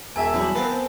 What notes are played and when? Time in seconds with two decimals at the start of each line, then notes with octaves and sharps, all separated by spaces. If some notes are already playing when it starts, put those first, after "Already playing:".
0.16 E1 E5 G#5 A5
0.34 E2 F#3 G3
0.55 B3 C4 A4 A#4 F5